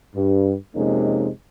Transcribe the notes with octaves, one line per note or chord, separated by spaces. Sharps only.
G2
F2 C3 G#3 A#3 C#4 D#4